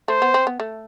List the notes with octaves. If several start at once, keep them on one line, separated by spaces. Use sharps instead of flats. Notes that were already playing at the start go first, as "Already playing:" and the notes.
A3 C5
B3
C4
B3
A3